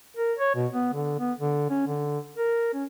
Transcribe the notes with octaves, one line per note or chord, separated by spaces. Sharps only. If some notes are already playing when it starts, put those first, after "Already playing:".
A#4
C#5
B2
B3
D3
B3
D3
C#4
D3
A#4
C#4